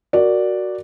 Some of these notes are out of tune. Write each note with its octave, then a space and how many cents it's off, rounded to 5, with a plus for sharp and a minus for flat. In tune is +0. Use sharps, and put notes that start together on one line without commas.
F#4 +0 A#4 +0 D5 +0